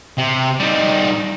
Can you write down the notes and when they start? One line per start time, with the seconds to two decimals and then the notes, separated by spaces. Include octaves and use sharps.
0.18 C3
0.59 G3 D#4